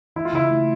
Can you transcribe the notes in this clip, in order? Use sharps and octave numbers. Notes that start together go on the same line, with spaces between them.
E3 E4
F4
C#3 E4
A3